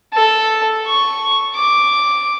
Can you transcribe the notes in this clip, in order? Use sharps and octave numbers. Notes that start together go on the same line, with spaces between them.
A4
C#6
D6